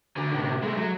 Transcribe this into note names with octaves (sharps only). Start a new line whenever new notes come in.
D2 D3
A2 C3
G#3 A3
F#3